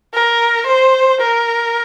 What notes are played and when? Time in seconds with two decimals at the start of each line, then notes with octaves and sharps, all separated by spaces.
0.14 A#4
0.67 C5
1.21 A#4